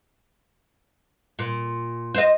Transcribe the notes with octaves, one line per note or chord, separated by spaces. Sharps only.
A#2
C5 D#5